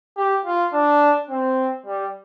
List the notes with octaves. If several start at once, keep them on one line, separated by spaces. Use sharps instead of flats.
G4
F4
D4
C4
G3